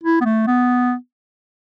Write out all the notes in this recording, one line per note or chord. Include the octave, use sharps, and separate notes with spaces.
E4
B3
A3
B3